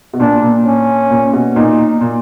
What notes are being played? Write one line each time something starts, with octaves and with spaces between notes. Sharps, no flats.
B2
A#2 D4
A#2
C#4
A#2
B2
A#2 D#4
A#2